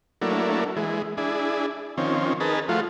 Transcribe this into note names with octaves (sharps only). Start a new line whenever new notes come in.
F#3 A3 A#3 D4 E4
E3 G#3
D4 E4 G#4
D#3 F3 C4 C#4
D#4 G#4 A#4 B4 A5
F3 A3 F4 F#4